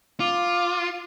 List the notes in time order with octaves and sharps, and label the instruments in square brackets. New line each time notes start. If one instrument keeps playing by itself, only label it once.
[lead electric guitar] F4 [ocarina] D6